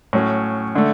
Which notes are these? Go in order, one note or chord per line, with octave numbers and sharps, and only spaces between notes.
A2 F#3 C#4
D3 A3